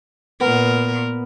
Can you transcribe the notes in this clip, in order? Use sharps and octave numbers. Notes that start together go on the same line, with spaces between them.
A#2 B3 A#4